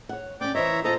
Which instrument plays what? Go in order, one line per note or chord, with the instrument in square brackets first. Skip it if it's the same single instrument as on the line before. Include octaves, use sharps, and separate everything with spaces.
[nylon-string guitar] C#5 F#5
[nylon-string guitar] C4 C#4 [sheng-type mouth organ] D5 G5 D6
[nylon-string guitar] E3 C5 D#5 [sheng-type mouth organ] C#5 E5 A#5
[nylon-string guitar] A#2 C5 F5 [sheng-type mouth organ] A4 D#5 A#5